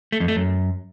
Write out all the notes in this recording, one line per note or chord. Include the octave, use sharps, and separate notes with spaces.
A3
F2
A3
F#2